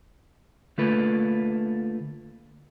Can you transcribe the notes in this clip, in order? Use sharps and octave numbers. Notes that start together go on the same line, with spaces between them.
D3 A3 A#3 F4 A4 B4